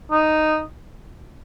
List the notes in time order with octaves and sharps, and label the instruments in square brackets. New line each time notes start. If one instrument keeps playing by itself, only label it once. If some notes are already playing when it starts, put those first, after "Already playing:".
[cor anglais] D#4